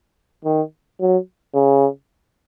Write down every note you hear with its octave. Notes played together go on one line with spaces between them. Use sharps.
D#3
F#3
C#3